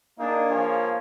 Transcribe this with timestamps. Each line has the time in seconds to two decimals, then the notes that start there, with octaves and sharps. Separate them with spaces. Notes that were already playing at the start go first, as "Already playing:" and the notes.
0.18 A#3 D4 D#4 G#4
0.50 F3 G#4 C#5